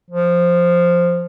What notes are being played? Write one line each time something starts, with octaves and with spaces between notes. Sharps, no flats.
F3